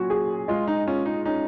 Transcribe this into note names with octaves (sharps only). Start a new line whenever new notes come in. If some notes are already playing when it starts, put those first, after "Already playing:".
Already playing: A#2 F#3 C#4 F#4
G#4
G#3 F4
D#4
C#4 F4
D#4
C#4 D#4